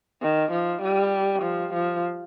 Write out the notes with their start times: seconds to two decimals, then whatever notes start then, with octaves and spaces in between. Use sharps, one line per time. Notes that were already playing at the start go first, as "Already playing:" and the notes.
0.22 D#3
0.51 F3
0.82 G3
1.42 F3
1.73 F3